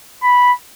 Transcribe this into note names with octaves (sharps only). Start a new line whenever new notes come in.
B5